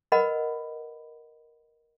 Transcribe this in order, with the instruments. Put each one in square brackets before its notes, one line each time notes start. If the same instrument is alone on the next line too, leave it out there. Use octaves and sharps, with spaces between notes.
[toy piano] A#4 B4 D#5 F#5 B5